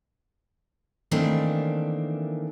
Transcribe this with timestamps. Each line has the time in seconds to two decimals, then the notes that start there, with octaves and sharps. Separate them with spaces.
1.11 D#3 E3 A3 A#3 C4 D4